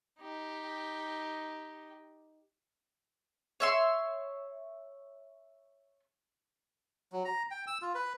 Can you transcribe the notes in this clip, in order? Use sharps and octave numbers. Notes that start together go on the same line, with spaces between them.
D#4 G4
C#5 E5 C6
F#3
A#5
G5
E6
F4
B4